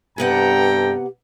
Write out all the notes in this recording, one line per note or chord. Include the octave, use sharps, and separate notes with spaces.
G2 C3 B3 G4 A4 F#5 G5 A#5